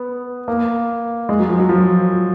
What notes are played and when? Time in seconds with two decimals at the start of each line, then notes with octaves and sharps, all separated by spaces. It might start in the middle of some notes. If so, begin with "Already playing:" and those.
Already playing: B3
0.48 A#3
1.29 G#3
1.39 F#3
1.49 F3
1.59 F#3
1.69 F3